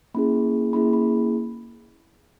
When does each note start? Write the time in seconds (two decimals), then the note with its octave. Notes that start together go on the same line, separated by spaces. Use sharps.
0.14 A#3 C#4 E4 G#4 B5
0.73 A#3 C#4 E4 G#4 B5
0.93 B5